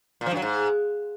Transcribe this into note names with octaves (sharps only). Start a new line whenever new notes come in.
A#2
F3
G2
F#3
G#2